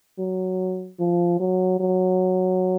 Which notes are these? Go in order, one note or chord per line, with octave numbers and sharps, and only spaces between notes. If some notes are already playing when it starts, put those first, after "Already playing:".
F#3
F3
F#3
F#3